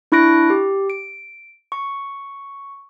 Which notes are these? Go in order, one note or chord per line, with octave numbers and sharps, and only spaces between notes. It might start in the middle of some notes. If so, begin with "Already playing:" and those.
D4 E4 C#6 F#6 A#6 D7
G4
D7
C#6